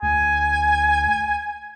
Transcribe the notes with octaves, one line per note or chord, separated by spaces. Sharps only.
D2 G#5